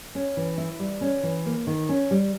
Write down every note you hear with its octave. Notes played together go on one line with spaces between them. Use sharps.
C#4
E3
E4
G3
C#4
E3
A#3
D#3
C#4
G3